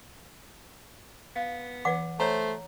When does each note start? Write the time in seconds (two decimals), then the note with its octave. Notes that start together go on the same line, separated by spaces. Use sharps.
1.36 B3 F5
1.85 E3 B4 F#5 D6
2.20 A3 C5 C#5 A#5